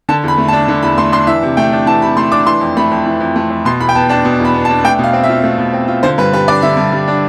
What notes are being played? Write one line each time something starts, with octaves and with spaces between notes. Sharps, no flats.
D3 A5
E2 B5
A3
A5
D4
D3
E2 B5
A3 C6
D4 C6
E3 E5
C3
A3 G5
D4
E3 A5
C3 B5
A3 C6
D4 D6
E3 C6
F2
A3 B5
F2
E3
F2
A3
F2
B2 C6
E2 B5
G5
B3 A5
D4 A5
B2
E2
B5
B3
A5
D4
A3 G5
B2 F5
C4
E5
F4
A3
B2
C4
F4
D3 C5
G2 B4
G3 B4
D4 D5
D3 E5
G2
G3
D4